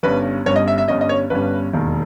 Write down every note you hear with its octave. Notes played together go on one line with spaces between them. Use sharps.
G1 G2 G3 C#4 B4
G1 G2 G3 C#4 C#5
D#5
E5
E5
G1 G2 G3 C#4 D#5
D#5
C#5
G1 G2 G3 C#4 B4
E1 D#2 D#3